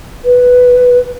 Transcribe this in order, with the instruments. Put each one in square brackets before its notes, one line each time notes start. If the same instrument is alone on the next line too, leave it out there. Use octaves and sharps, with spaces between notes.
[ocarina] B4